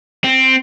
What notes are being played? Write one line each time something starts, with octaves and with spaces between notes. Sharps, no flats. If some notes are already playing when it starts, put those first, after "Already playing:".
C4